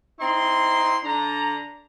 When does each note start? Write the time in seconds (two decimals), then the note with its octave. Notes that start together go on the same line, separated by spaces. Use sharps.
0.19 C4 D#4 E4 C6
1.04 D3 D4 A#5